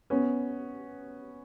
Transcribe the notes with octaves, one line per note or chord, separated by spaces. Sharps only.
B3 C#4